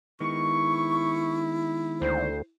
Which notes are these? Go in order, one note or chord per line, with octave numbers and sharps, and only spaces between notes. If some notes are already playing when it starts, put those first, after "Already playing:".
D#3 G#3 B3 E4 C#6
D2 C5